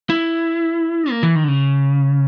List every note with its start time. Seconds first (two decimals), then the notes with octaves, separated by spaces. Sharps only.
0.10 E4
1.10 A#3
1.23 E3
1.36 D#3
1.44 D3
1.48 C#3